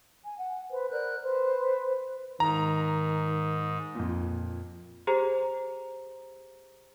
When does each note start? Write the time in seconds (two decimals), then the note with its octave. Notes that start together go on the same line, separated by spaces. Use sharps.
0.24 G#5
0.37 F#5
0.71 B4 C5
0.90 A#4 D5 F#6 G6
1.23 B4 C5
2.40 G#2 D#3 A#5
3.95 F2 A#2
5.07 G4 G#4 C5 A#5